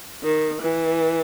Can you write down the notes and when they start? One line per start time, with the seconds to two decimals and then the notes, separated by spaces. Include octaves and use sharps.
0.24 D#3
0.61 E3